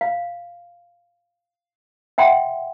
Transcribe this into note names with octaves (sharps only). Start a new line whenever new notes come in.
F5
E5 F#5 G5 C6